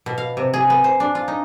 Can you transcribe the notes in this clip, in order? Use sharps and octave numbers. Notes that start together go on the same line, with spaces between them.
B2
F5
C3
G#4
B3
C5
D4
F4
D#4